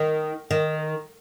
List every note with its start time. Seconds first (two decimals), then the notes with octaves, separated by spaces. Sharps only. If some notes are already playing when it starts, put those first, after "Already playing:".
Already playing: D#3
0.51 D#3